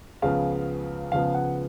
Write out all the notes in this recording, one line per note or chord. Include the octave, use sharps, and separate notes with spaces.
C#2 C#3 F3 B3 F5
C#2 C#3 F3 B3 F5
F#5